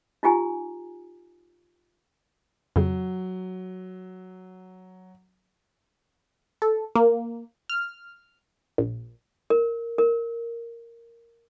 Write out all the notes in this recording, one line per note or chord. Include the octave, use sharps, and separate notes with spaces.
D#4 F4 G4 G#5 A#5
F2 C#3 F#3
A4
A#3
F6
A#1
A#4
A#4